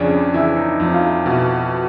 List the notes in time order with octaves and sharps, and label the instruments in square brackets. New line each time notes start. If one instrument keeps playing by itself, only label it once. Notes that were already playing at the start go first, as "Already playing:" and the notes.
Already playing: [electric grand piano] F2 C#3 [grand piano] C#4 D4
[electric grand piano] E3 [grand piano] E4
[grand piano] D#4
[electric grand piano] F2 [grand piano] D#4
[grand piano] F4
E4
[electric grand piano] B2 [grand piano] E4